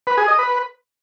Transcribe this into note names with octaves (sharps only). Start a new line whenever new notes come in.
B4
G#4
D#5
B4